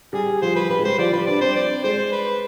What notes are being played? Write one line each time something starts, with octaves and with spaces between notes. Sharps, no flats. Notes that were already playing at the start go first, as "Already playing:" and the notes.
G3 G#4
F3 C5
B4
G3 B4
G#3
G3 C5
F3 D5
G3 B4
D4 D5
C4 C5
D5
G#3 C5
B4